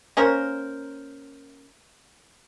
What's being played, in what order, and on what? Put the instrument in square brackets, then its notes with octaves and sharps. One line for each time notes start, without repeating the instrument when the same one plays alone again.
[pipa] A#3 C#4 A#4 C5